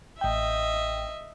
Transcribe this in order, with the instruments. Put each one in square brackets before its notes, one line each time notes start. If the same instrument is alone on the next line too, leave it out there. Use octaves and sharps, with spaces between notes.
[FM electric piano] A1 G5 [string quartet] D#5 E5